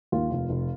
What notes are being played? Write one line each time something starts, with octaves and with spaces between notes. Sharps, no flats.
D#2 F4
F1
F1